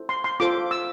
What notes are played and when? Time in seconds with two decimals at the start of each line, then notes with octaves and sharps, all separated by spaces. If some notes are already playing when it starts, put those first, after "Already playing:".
Already playing: E4 A4 C5
0.09 C6
0.24 C6
0.40 F4 A4 C5 D6
0.71 E6